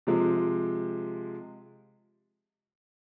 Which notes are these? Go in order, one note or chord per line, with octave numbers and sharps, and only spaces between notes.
C3 F3 G#3